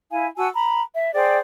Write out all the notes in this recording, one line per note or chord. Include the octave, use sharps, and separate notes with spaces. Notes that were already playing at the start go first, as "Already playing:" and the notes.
E4 F5 G#5
F#4 G#5 A5 E6
A#5 B5
E5
G#4 C5 D5 G5